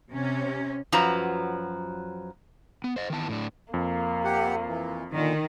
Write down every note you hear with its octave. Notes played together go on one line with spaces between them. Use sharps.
C3 C#4
F#2 F3 F#3 B4 A#5
B3
C5 D#5
D#3 E3 B3 A5
A2 D4
F2 A#3
G4 F#5
E3
A#2 D3 D#3